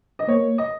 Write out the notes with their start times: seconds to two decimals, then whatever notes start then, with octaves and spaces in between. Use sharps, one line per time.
0.19 D#5
0.28 A#3 C#5
0.58 D#5